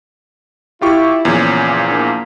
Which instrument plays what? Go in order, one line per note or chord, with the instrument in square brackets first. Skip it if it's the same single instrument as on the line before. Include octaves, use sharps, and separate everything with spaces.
[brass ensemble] E4 [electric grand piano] F4 G4 C#6
[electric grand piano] E2 A#2 F3 [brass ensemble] C#3
[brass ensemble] A#3 D4